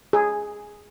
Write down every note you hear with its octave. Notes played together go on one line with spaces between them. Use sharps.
G#4